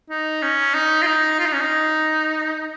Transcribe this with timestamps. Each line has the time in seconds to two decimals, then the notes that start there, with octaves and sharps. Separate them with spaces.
0.10 D#4
0.42 C#4
0.74 D#4
1.02 F4
1.07 D#4
1.39 F4
1.46 D#4
1.53 C#4
1.61 D#4